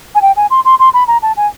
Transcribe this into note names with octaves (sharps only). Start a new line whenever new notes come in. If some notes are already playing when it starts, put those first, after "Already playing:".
G#5
G5
G#5
C6
C6
C6
B5
A#5
A5
G#5